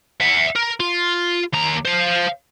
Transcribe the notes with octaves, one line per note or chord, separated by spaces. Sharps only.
E5 F#5
A#4
F4
D#2 A#5
C5 F5